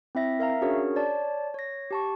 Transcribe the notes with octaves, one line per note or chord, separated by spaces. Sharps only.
C4 E4 E5 A#6
A#4 E5 F5 A#5
C#4 D4 F#4 G#4 A#4 C#5
C#5 D5 A5
C#5 A#6
G4 A5 C#6